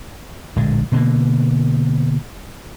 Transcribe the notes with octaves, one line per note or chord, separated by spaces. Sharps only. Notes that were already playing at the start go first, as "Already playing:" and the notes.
D1 A#1 D3 G#3
B2 D3 A#3